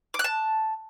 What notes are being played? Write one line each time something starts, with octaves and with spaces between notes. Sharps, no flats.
D6
F#6
A5